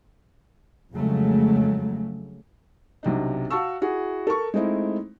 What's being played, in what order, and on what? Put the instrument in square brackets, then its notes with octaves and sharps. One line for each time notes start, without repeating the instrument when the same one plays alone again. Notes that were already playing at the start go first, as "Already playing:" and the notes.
[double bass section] F2 C#3 F#3 G#3 A3
[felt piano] B1 C3 D4 D#4
F#4 F5 A5 C#6 E6
E4 F#4 G#4
A4 A#4 C#6
G#3 A3 C4 D#4 E4